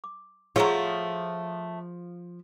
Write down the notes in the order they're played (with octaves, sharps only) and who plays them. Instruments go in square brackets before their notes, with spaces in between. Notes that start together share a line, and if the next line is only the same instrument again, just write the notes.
[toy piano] D6
[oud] F3 F4 [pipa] F#3 A3 C#5 [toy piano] G#4 C#6 E6